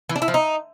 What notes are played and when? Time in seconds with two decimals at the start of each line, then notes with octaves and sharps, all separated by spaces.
0.09 E3
0.16 D4
0.22 E4
0.28 F3
0.34 D#4